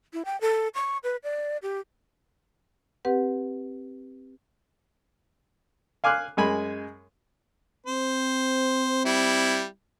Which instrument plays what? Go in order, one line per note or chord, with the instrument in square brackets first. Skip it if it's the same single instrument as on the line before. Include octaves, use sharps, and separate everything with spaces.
[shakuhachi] E4
G5
A4
C#6
B4
D5
G4
[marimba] C4 G4 B4 F#5
[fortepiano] F5 G#5 D6 F6 F#6
F#2 G#3 G#5 B5
[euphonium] C4 [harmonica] C5
[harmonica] G3 E4